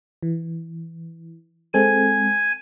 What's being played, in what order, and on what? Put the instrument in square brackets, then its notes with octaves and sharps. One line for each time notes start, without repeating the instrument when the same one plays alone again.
[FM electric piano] E3
[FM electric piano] G#3 C4 A4 [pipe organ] G#5